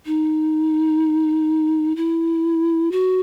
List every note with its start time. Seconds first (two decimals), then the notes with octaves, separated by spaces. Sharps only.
0.06 D#4
1.96 E4
2.92 F#4